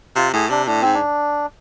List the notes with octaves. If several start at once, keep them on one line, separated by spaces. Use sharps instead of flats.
C3 F4
A2 G#4
C3 D4
A2 D4
G#2 C4
D4